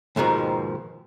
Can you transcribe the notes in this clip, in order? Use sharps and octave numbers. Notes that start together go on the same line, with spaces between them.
D#2 G#2 B2 D#3 F3